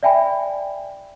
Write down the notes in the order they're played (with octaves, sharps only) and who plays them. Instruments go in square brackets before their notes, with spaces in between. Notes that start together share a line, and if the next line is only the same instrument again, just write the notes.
[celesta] D5 E5 G5 G#5 B5